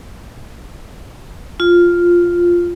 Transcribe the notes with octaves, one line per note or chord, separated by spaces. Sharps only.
F4